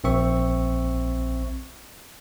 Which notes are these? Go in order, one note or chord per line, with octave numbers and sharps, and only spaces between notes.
A#1 C4 E5 C#6